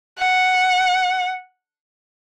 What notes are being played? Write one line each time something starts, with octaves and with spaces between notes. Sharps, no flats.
F#5